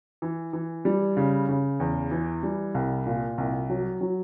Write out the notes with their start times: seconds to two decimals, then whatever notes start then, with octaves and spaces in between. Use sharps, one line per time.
0.22 E3
0.53 E3
0.85 G3
1.17 C#3
1.48 C#3
1.80 E2
2.11 E3
2.43 G3
2.74 C2
3.06 A#2
3.38 C2
3.70 F#3
4.01 F#3